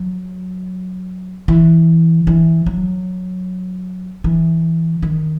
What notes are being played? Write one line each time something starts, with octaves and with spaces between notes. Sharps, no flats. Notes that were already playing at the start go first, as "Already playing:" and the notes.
Already playing: F#3
E3
E3
F#3
E3
D#3